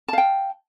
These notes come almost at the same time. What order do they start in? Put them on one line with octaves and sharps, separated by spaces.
A5 F5 G5